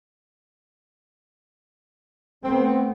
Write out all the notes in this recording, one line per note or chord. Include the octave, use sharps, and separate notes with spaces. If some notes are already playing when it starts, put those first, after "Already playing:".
A3 B3 C4